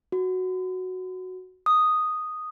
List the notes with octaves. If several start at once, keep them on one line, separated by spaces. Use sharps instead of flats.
F#4
D#6